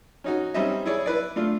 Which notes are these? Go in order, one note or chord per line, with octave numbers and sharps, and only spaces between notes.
C#4 D#4 F#4
G3 C4 C#4 D#4 D#5 E5
E4 G#4 C#5 D5
E4 B4 D5
A3 D4 F4